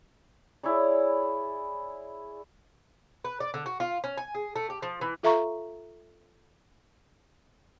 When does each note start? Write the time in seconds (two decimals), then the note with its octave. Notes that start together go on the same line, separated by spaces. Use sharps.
0.63 E4 G#4 C#5 D5
3.25 B4
3.40 D5
3.54 D3
3.66 F#4
3.80 F4
4.04 C#4
4.17 G#5
4.35 G#4
4.56 A3
4.70 G4
4.82 F3
5.01 E3
5.23 F4 A4 E5 F5 A#5 C#6